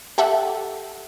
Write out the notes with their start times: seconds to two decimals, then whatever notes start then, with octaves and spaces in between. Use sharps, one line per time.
0.18 G4 A4 E5 F#5